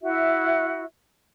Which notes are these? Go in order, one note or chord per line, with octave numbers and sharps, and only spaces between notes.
E4 F#4 E5